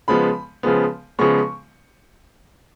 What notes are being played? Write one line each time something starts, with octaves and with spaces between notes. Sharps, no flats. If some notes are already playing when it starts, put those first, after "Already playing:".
C#3 F3 G#3 B3 B5
C#3 F3 G#3 B3
C#3 F3 G#3 B3 C#6